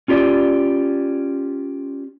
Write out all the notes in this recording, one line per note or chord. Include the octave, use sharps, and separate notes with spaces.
C#4 F4 G4 D5